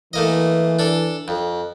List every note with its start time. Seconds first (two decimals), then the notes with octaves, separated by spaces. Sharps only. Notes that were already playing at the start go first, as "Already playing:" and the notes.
0.13 E3 A3 A#3 D#5
0.79 D4 A4
1.28 F2